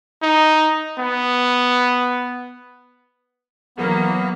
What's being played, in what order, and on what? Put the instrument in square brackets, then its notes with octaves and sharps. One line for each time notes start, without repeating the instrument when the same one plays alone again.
[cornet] D#4
B3
[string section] E3 F#3 A#3 [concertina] B3